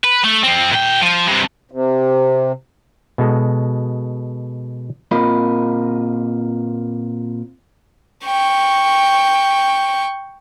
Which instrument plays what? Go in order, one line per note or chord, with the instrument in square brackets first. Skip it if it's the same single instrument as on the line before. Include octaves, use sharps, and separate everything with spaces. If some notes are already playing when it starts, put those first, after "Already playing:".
[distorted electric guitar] B4
A3
F3 C4
A#2 G5
F3
G2 C3
[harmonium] C3
[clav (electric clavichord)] B2 G#3 A4
[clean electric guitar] A#2 C4 F4 A#4 D#5 B5
[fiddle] G5 C#6